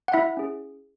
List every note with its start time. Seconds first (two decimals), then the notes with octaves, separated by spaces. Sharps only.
0.08 F#5
0.13 E4 E5
0.37 C#4 G#4